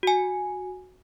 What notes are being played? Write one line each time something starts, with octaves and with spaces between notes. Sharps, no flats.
F#4 G#5